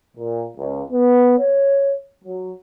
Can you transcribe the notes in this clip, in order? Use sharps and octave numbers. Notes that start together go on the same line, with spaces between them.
A#2
C#2
B3
C#5
F#3